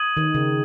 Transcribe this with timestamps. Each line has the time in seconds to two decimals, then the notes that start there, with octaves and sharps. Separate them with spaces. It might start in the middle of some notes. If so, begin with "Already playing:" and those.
Already playing: D#6 G#6 D#7 F#7
0.17 D#3
0.34 C#3